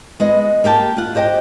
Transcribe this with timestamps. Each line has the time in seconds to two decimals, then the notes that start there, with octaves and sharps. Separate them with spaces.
0.20 G#3 B3 B4 D#5
0.64 A#3 G4 G5 A5
0.97 F4 F#5
1.15 G4 C5 D#5 F#5 G5